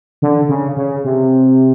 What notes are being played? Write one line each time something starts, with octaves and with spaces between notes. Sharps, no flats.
D3
C#3
C#3
C3